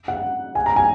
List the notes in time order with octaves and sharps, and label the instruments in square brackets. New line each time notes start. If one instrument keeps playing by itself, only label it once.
[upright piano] F#5
G#5
A#5
G#5